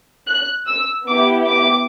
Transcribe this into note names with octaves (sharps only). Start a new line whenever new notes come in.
F#6
E6
B3 E4 G4 D6
D6